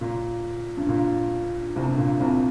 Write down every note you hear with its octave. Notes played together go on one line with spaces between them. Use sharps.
A#2
G2
A#2
C2 C3
G2
A#2
C2 C3